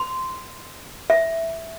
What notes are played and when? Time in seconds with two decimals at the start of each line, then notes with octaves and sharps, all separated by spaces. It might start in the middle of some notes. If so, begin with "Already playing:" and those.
Already playing: C6
1.10 E5